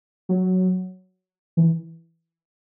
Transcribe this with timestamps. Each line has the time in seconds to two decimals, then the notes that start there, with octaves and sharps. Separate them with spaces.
0.29 F#3
1.57 E3